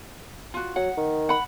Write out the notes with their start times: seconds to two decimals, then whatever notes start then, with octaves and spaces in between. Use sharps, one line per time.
0.54 F4 F#4
0.76 F#3 F#5
0.97 D#3
1.29 F#5 B5